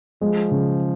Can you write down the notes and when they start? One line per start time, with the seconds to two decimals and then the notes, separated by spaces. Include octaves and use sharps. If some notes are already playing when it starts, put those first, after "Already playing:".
0.21 F3 G#3
0.51 C#3